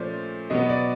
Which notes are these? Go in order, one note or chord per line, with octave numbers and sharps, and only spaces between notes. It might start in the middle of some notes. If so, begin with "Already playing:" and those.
Already playing: A#2 F3 A3 C#4 C5 D5
B2 F#3 B3 D#5
D5